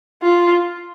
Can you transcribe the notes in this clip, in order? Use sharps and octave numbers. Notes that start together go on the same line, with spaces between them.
F4